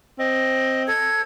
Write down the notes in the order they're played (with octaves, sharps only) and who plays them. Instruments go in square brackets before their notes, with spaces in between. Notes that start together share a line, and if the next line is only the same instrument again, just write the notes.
[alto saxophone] C4 [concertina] D#5
[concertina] A4 [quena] G#6